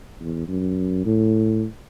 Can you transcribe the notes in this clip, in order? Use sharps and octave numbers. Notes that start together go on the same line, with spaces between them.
E2
F#2
A2